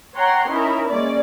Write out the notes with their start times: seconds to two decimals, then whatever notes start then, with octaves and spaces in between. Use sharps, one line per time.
0.15 C#5 F#5 G5 A#5 C6
0.49 C#4 D#4 E4 A#4
0.89 G#3 A#3 C#4 D5